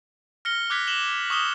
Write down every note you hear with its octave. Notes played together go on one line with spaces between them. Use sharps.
F6 A#6 C#7 G7
D6 F#6 G#6 B6
E7 F#7 G7
C#6 D#6 E7 G7